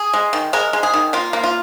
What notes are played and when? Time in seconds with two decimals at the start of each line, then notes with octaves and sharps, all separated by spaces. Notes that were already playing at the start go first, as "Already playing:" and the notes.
Already playing: G#4
0.13 G#3
0.33 D#3
0.53 G#3 A#4
0.73 G#3
0.83 G#4
0.94 D#3
1.13 A#3 F4
1.33 A#3
1.44 F4